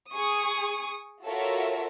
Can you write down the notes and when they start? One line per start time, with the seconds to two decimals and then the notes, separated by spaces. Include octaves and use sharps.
0.11 G#4 C#6 D#6
1.24 F4 F#4 A4 A#4 C#5 E5